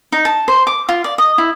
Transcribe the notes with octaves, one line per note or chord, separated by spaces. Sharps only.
D#4
A5
C5
D6
F4
D5
D#5
E4